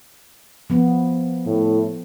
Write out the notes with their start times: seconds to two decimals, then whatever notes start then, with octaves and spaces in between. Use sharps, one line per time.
0.70 F3 B3
1.46 A2